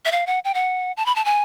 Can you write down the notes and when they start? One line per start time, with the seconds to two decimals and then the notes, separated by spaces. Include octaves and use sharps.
0.05 E5
0.12 F5
0.27 F#5
0.45 G5
0.54 F#5
0.97 A5
1.06 B5
1.16 A5
1.25 G#5